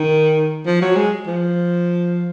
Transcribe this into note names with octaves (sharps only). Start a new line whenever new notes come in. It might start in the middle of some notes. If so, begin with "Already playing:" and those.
Already playing: D#3
F3
F#3
G#3
F3